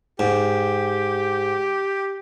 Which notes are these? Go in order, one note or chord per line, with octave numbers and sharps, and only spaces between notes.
G#2 G4